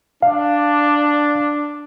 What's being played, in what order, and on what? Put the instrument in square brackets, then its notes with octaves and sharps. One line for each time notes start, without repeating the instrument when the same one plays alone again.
[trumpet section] D4 [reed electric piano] F5